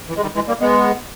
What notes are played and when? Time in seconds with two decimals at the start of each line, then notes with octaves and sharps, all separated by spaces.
0.09 E3
0.16 G#3
0.22 D#3 G3
0.35 E3 G#3
0.48 G3 A#3
0.61 G#3 B3